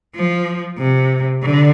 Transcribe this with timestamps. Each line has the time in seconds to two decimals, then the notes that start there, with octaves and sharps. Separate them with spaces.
0.15 F3
0.79 C3
1.43 D3